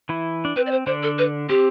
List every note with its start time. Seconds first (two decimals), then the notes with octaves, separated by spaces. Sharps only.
0.09 E3 E4
0.45 D4
0.56 C4 B4
0.66 D5
0.71 C5
0.86 D3 D4 C5
1.03 A4
1.19 B4
1.49 C4 G4